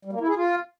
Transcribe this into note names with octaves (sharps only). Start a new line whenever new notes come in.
G3
A#3
E4
G#4
F4